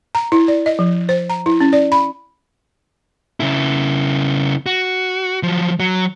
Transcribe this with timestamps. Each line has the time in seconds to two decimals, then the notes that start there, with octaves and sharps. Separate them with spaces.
0.15 A#5
0.32 E4
0.48 D5
0.66 D#5
0.79 F3
1.09 C5
1.30 A#5
1.46 E4
1.60 C#4
1.73 D5
1.92 B5
3.40 C#3 E4
4.66 F#4
5.43 F3 F#3
5.80 F#3